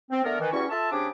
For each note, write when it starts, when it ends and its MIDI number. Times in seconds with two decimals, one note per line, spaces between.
0.11 0.22 60
0.24 0.36 50
0.24 0.36 57
0.24 0.36 59
0.24 0.36 70
0.39 0.50 51
0.39 0.50 52
0.53 0.64 40
0.53 0.64 55
0.53 0.64 61
0.53 0.64 64
0.53 0.64 66
0.53 0.64 85
0.70 0.88 65
0.70 0.88 69
0.70 0.88 76
0.70 0.88 81
0.92 1.08 49
0.92 1.08 60
0.92 1.08 62
0.92 1.08 67
0.92 1.08 68
0.92 1.08 86